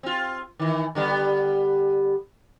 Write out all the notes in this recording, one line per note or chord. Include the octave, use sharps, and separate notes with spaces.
C4 F4
D#3 E3
D3 G3 B3